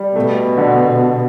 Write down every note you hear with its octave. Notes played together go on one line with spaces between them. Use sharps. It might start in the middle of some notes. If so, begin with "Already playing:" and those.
Already playing: G3
B2 A3
D3